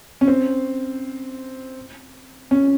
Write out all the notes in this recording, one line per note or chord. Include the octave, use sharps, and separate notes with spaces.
C#4
C4
C#4